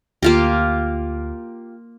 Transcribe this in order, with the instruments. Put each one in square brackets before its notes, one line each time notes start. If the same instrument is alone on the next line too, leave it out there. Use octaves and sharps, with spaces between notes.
[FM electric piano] D2 [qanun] A#3 F4 G4